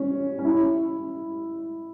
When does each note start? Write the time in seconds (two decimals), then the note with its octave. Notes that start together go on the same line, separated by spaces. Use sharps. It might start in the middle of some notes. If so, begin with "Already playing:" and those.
Already playing: C#4
0.39 C#4
0.45 E4